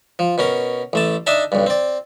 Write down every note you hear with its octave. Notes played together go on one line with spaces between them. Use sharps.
F3
B2 C#4 A#4
A1 A3 A5
D4 D#4 D#5 E5 A5
B1 G2
C4 D5